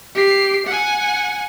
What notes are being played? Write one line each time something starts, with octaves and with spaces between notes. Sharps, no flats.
G4 C7
F#5 G#5